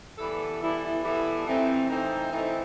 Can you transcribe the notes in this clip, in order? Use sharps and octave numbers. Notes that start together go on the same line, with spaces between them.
E3 G3 B3 E4 A4
E3 G3 B3 E4 A4
E3 G3 B3 E4 A4
E3 A3 C4 D#4
E3 A3 C4 D#4
E3 A3 C4 D#4